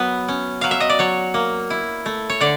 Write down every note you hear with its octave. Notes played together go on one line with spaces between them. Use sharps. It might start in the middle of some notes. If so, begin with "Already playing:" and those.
Already playing: F#3 B3 B4
C#4
F#3 F5
E5
D#5
D5
F#3 C#5
A#3
E4
A3
C#5
D3 D5